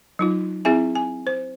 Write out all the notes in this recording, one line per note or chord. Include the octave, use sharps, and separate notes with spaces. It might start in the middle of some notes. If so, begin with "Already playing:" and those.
F#3 D#4 F4
C4 E4 G#4 E5 G#5
G#5
C5